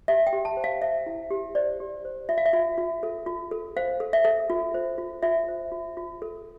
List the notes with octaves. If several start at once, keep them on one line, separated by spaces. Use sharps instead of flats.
G4 E5
G5
G4
A5
C5
F5
C5 E5
E4
G4
C5 D5
G4
C5
F4 E5
F5
E5
F4
F4
A4
F4
A4
C5 F5
A4
E5
A4
F4
C5
F4
F4 E5
C5
F4
F4
A4